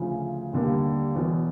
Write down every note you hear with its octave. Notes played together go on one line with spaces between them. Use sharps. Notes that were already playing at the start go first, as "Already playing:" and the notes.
Already playing: D2 C#3 F3
D#2 D3 G3 A#3
E2 B2 F#3